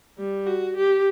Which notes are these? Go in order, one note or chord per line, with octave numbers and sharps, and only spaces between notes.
G3
F#4
G4